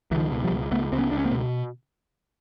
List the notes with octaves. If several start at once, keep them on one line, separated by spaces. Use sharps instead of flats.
C#2 E3
D#3 F3
B2
F3 G3
C#2
C#2 A3 B3
C#2 C4
B3 C#4
C#2 D4
C#4
A#3 C4
B2